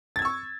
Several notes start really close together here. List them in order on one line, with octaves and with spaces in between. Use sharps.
A6 G#6 E6 C#6